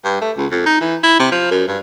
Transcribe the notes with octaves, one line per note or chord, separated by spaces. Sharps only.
G2
A3
C#2
F2
D#4
E3
E4
C3
F3
F#2
G2